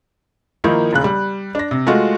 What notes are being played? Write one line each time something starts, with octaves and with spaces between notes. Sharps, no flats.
D#3 F3 A#3 D#4 E4
E1 C#3 F#6
G3
D4 A#6
C3
G#3 A3 F4 F#4